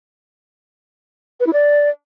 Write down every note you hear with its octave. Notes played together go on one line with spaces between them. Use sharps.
B4
E4
D5